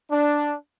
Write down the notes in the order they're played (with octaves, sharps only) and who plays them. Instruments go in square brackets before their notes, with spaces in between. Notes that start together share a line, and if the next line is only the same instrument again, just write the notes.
[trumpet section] D4